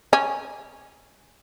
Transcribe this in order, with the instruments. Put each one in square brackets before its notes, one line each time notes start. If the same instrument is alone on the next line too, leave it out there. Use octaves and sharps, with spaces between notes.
[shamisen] C#4